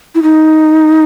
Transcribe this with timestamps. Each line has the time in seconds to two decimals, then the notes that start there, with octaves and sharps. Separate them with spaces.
0.15 E4
0.23 D#4